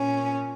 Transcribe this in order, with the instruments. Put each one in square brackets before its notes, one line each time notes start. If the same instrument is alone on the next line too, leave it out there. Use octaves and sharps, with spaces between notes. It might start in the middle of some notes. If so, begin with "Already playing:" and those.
Already playing: [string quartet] A#2 C#4